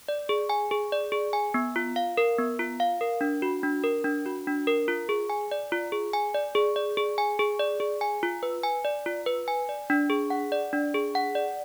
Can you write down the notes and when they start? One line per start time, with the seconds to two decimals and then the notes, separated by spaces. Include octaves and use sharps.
0.08 D5
0.29 G#4
0.50 G#5
0.71 G#4
0.92 D5
1.12 G#4
1.33 G#5
1.54 B3
1.76 F4
1.96 F5
2.18 A#4
2.38 B3
2.59 F4
2.80 F5
3.01 A#4
3.21 D4
3.42 F#4
3.63 D4
3.84 A#4
4.04 D4
4.26 F#4
4.47 D4
4.67 A#4
4.88 F4
5.09 G#4
5.30 G#5
5.51 D5
5.72 F4
5.92 G#4
6.13 G#5
6.35 D5
6.55 G#4
6.76 D5
6.97 G#4
7.18 G#5
7.39 G#4
7.59 D5
7.80 G#4
8.01 G#5
8.23 F4
8.43 B4
8.63 G#5
8.85 D5
9.06 F4
9.26 B4
9.48 G#5
9.69 D5
9.90 D4
10.10 G#4
10.30 F#5
10.52 D5
10.73 D4
10.94 G#4
11.15 F#5
11.35 D5